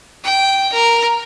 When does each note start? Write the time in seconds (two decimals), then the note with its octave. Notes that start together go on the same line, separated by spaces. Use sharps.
0.24 G5
0.72 A#4